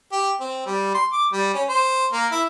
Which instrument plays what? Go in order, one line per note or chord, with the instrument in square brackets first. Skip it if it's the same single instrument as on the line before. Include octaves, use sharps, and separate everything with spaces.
[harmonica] G4
C4
G3
C6
D6
G3
C#4
C5
A#3
E4